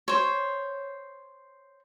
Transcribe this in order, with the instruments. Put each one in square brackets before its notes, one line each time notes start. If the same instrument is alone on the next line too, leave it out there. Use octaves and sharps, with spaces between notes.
[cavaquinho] C5 C#5